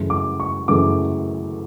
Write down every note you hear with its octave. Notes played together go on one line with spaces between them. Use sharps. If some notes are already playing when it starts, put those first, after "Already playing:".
Already playing: F#2 C#3 E3 A3
D6
C#6
F#2 C#3 E3 A3 D6